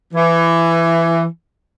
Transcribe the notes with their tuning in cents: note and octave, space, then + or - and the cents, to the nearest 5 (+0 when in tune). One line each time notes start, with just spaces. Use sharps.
E3 +20